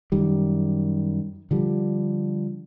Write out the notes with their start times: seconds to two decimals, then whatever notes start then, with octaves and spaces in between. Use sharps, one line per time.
0.12 F#2 D#3 G3
1.51 D3 F3 G3